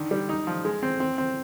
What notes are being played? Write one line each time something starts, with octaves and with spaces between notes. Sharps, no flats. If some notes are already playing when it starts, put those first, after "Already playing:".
Already playing: D3 D#3
G3
D#4
F3
G#3
C4
C4
C4